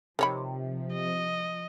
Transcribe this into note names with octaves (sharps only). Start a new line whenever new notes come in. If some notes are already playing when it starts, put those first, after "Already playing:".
C3 D#3 F3 C#5 B5
D#5